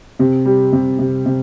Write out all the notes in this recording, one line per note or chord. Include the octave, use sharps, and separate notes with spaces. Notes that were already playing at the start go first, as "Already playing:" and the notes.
C3
G3
C3
C3
C3